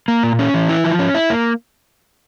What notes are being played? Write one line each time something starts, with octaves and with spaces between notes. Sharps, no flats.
A#3
A#2
C#4
E3
E4
F3
C#4
E4
A#3